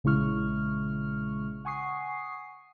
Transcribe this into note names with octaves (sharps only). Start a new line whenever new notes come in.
A#1 C#3 G#3 E4 C#6 F6
F#5 G#5 C#6 D#6 C7